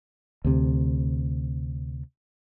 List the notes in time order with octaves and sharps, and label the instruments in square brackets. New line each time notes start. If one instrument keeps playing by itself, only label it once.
[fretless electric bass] D2 C3